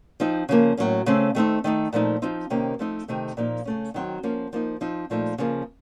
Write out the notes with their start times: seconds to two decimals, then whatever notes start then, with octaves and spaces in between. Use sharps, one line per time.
0.20 F3 C4 D#4
0.49 C#3 F3 A#3
0.77 A2 F#3 A#3 C#4
1.06 C#3 A3 C4
1.35 D#3 A3 C4 D#4
1.64 D#3 A3 D#4
1.93 A#2 F3 A3 D#4
2.22 F3 C4 D#4
2.50 C3 D#3 A#3 C#4
2.79 F3 A3 C4 D#4
3.08 C3 D#3 A3
3.37 A#2 F3 A#3 D#4
3.65 C#3 A3 C#4
3.94 D#3 F#3 C4
4.23 F3 A#3 C#4
4.53 F3 A#3 D#4
4.81 F3 C4 D#4
5.10 A#2 F3 A3 D#4
5.38 C#3 F3 A#3 C#4